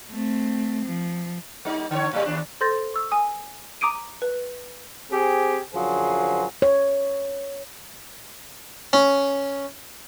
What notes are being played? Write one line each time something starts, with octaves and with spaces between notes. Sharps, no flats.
A3 C4
F3
G3 D#4
D3 C#5
A2 G3
D#2 D4
A4 C5 C6 G6 A6 A#6
C#6 E6
G#5 D#6
A#5 D6 D#6 D7 D#7
B4
C4 G4 G#4
F#2 D3 F3 F#3 G#4 C5
C#5
C#4